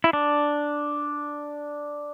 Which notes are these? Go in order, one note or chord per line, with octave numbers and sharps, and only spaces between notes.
E4
D4